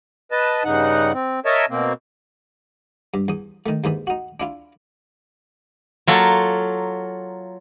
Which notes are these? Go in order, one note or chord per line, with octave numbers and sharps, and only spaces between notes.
B4 D#5 A5
G2 C#3 D#4 F#5
C4
A#4 C#5 D#5 E5 A5
B2 A#3 C4
G2
E2 D#6
D#3 A3
D#2 G#2 E3 D#6
D#4 F#4
D4 E4 F4
F#3 A#3 F4 A4 A#4 A#5